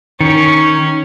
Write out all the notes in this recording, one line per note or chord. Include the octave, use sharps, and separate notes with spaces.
D#3 C#4